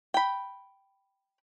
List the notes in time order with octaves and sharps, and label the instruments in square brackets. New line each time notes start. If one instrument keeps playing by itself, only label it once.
[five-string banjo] G5 B5